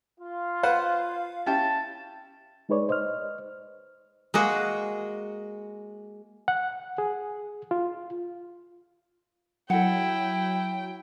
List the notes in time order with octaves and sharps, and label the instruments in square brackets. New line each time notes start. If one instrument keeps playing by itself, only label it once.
[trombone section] F4
[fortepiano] B4 C5 F#5 [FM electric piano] F5
[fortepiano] C#4 E4 G4 [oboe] A5
[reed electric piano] G#3 D#4 G#4 B4 C#5 D5
C5 D#5 F6
[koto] G#3 A#3 F#4 G#4
[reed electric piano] F#5
G#4
F4
[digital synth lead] F#3 [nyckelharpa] E4 [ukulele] A4 F#5 [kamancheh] G5